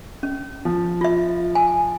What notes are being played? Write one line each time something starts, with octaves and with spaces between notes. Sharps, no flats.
C#4
F3
F4 E5
G#5